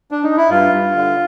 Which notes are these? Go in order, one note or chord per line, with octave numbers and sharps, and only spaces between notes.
D4
D#4
E4
G2 F4
G2
D3